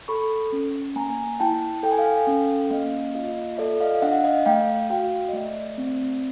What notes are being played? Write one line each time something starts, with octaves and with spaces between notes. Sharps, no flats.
A4 B5 C#6
C#4
A#3 G#5 A#5
E4 G5 A5
A4 G5
G#5
F5 G5
C#4
A#3 D#5 F5
F4 D#5 F5
A4 D5 E5
D#5 F5
F5
D4 E5 F#5
D#5 F5
A3 F5 G5
F#4 F5 G5
D#5
A3 D5 E5
C4